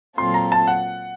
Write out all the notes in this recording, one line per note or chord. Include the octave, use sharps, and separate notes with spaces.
A#2 F#3 C4 F4 A4 C6
A#5
A5
F#5